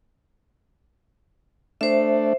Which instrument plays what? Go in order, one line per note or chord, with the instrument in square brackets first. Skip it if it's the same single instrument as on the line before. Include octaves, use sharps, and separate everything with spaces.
[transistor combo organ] A3 D4 [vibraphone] C5 E5